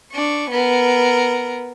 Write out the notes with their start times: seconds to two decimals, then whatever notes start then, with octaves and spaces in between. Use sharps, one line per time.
0.12 D4 C#6
0.50 B3 A#4